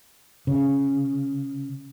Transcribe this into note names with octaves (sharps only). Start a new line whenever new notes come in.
C#3